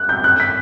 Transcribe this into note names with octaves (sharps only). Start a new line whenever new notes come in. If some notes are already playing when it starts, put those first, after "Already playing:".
Already playing: F#6
G6
F#6
B6